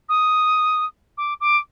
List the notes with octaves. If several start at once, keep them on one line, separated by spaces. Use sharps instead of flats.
D#6
D6
D6